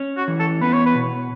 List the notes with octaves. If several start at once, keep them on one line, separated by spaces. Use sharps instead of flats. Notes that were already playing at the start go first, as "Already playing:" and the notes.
Already playing: C#4
F#4
E3
A4
B3 B4
C#5
B4
B2